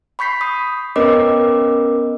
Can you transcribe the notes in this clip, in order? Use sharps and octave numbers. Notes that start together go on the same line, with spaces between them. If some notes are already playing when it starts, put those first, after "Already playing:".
B5 C#6 G6 B6 C7
D#6
B3 C#4 A#4 B4 D#5 D6